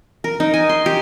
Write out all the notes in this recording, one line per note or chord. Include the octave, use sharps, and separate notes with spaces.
A#4
D#4
G#5
C6
G4